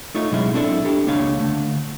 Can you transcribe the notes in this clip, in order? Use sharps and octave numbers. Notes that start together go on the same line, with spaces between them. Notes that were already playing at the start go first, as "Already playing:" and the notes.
A3 D#4 F4 C#5
B2 F#3 G#3 C#4 E4
C4 D4 E4 G#4 A4
D4 G4 A4
C#2 A#3 D4 C#5 F5
D3 A3